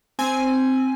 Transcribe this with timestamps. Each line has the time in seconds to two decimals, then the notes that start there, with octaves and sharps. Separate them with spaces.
0.19 C4 G#5